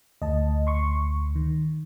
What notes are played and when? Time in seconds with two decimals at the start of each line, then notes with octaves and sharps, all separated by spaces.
0.22 D2 D#5 A5
0.67 C6 C#6
1.35 D#3